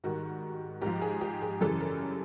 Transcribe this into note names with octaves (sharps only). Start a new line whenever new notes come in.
G#2 D#3 G3 F#4
G#2 F3 G4
G#4
G4
G#4
F#2 C#3 E3 G3 A4
A#4